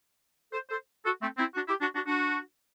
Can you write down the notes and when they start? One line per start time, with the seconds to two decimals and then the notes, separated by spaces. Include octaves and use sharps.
0.52 A4 C5
0.69 A4 C5
1.04 F#4 A4
1.20 A3 C4
1.37 C4 E4
1.54 D4 F#4
1.67 E4 G4
1.80 D4 F#4
1.93 D4 F#4
2.05 D4 F#4